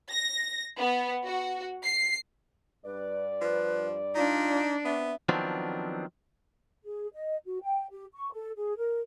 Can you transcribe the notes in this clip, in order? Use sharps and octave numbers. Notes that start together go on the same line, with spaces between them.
A#6
B3
F#4
C7
G2 B4 D5
F3 B4
D4 D#4 F4
B3 C4 E5
D#3 F3 F#3 B3 C4 D4
G#4
D#5
F#4
G5
G4
C#6
A4
G#4
A#4